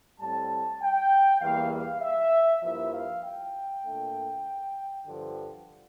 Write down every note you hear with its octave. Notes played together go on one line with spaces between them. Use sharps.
A2 G3 C4 A5
G5
E2 E3 G3 A#3 F5
F5
E5
G2 F3 A#3 E4 E5
F5
G5
A#2 A3 D4
G2 D3 F3